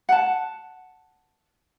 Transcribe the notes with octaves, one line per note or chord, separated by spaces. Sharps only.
F#5 A5